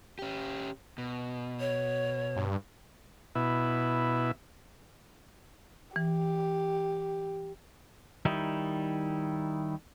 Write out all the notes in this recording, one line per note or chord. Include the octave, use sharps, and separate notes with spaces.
C#4 G4
B2
C#5
G2
B2 E4
E3 G4
D#3 G3 D#4 E4